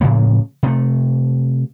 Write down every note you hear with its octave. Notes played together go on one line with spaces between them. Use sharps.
A2 C#3 F3 A#3
C3 A3